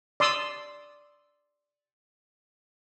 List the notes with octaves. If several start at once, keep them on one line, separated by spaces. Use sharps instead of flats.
D5 C6 D#6 E6